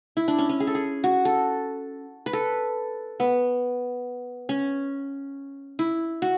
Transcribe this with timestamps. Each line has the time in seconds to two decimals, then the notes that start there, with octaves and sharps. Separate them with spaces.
0.17 E4
0.28 D4
0.39 C#4
0.49 C#4
0.60 G#4
0.67 A4
0.75 G#4
1.04 F#4
1.25 A4
2.26 B4
2.33 A4
3.20 B3
4.49 C#4
5.79 E4
6.22 F#4